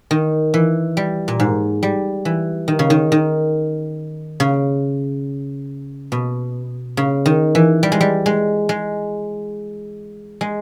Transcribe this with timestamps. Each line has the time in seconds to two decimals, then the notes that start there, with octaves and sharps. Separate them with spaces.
0.11 D#3
0.54 E3
0.97 G3
1.28 A#2
1.40 G#2
1.83 G3
2.25 E3
2.68 D#3
2.79 C#3
2.90 D#3
3.12 D#3
4.40 C#3
6.12 B2
6.97 C#3
7.26 D#3
7.55 E3
7.83 G3
7.92 G#3
8.01 G3
8.26 G#3
8.69 G#3
10.41 G#3